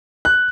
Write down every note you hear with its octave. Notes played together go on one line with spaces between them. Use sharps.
F#6